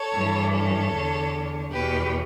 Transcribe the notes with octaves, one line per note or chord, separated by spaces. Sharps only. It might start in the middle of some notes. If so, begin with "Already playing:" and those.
Already playing: A4 C#5
G2 E3
A4 C#5
E2 D3
E2 B2 G4 B4